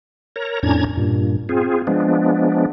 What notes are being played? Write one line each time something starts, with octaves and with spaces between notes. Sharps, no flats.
A#4 C#5 A#5
F2 A2 C#4 D4 A#5 G#6
G2 A#2
C4 F4 G#4
F3 G#3 B3 D4